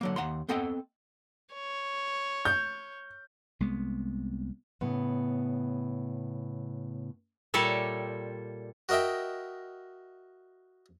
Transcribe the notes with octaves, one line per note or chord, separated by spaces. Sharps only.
D3 F#3 A#3
D#2 F#5 A#5 C6
B3 C4 A4 D#5 F#5 G5
C#5
G6
C2 G#3 B3
A2 C#3 B3
A#2 G3 A4 C#5 D5 E5
F#4 A#4 D#5 E5 G5